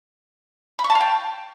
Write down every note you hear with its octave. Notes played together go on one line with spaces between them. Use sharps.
B5
C#6
A5
F5
G5